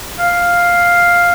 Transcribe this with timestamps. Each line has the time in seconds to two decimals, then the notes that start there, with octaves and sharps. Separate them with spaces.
0.20 F5